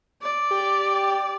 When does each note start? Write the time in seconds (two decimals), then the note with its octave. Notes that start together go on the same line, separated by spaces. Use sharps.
0.22 D5
0.51 G4